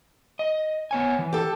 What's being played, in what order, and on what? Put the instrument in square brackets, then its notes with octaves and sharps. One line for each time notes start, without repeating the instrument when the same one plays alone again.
[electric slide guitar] D#5
B3 C#5 G#5
E3
[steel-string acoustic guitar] G4 A4